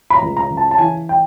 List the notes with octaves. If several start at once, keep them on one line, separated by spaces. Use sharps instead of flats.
B5
A#5
C#2
A#5
C#3
A5
A5
E3 G#5
G5